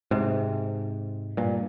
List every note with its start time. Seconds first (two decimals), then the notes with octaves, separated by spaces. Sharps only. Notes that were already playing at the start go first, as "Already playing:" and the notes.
0.11 G#2 C3
1.37 G2 A#2